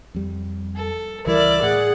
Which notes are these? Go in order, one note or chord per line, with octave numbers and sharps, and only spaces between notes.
F2 G3
A4
C#2 E3 G3 E4 A#4 D5
A2 G#4 F#5